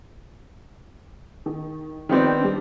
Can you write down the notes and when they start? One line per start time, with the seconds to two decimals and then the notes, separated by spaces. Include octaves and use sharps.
1.46 D#3
2.09 D#3 F3 B3 C4 G4 D5
2.40 G3 D4